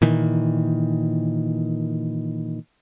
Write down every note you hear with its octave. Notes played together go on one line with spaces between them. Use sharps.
A#2 D#3 E3